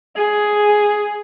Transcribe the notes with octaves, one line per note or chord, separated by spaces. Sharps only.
G#4